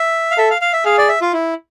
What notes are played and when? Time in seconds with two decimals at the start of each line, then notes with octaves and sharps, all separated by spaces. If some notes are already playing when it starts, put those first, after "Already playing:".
Already playing: E5
0.31 F5
0.38 A4 E5
0.50 F5
0.62 F5
0.73 E5
0.85 G#4 F5
0.98 D5
1.09 E5
1.21 F4
1.33 E4